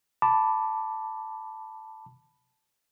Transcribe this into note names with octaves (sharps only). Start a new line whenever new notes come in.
A5 B5 D6